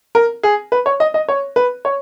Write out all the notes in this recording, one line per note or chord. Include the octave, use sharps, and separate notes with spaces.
A#4
G#4
B4
C#5
D#5
D#5
C#5
B4
C#5